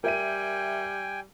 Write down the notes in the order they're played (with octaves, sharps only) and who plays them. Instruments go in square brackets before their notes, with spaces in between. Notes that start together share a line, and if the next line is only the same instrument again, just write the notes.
[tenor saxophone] G3 [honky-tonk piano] A#4 E5 D#7 [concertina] G5 G#5